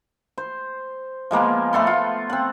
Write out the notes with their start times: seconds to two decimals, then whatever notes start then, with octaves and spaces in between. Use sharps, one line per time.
0.38 C5
1.31 F3 G#3 A#3 B3
1.73 A3 B3 A4 C6
1.87 F4
2.30 C4 F#5